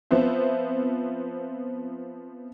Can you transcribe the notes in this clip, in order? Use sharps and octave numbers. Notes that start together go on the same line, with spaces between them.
F3 B3 C4 C5 E5